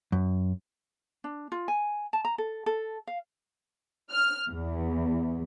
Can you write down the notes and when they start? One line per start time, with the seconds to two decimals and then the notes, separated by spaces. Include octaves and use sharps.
0.12 F#2
1.24 D4
1.52 F4
1.68 G#5
2.13 A5
2.25 A#5
2.38 A4
2.66 A4
3.07 F5
4.11 F6
4.50 E2